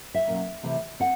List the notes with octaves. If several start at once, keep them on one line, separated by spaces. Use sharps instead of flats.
E5
B2 F#3 A#3 C#4
C3 E3 A3 C4
C4 F#5